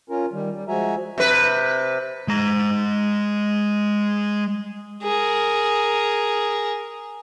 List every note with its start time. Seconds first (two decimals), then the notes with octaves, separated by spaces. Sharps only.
0.10 C#4 F4 A#4
0.33 D#3 G3
0.53 G3
0.68 F3 G#3 F#4 E5 G#5 A#5
1.18 C3 B4
2.28 G#3 A#5
5.03 G#4 A#4